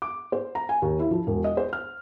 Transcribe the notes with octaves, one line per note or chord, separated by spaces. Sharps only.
D6
C5
A#5
G#5
D#2
E4
F3
E1
D#5
C5
F6